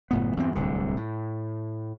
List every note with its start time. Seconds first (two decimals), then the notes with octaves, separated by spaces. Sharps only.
0.11 F#1 A2 B3
0.37 E2 G2 C4
0.55 D1 C2 D3
0.97 A2